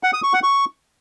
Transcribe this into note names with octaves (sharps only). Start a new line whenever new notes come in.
F#5
D#6
C#6
F#5
C#6